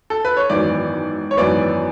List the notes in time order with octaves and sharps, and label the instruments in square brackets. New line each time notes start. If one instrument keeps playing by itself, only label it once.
[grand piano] A4
B4
C#5
G#1 F#2 E3 B3 D5
C#5
G#1 F#2 E3 B3 D5